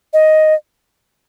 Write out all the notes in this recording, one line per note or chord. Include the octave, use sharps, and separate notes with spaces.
D#5